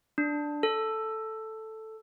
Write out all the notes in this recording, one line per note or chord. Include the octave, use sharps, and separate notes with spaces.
D4
A4